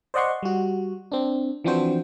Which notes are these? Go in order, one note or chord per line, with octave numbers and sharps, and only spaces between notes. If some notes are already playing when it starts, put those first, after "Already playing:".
C5 D5 D#5 F#5 C6 C#6
G3 F#4
C4 D4
E3 F3 C4 D4 F#4 C5